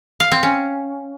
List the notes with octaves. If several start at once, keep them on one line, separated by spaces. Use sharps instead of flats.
F5
C4
C#4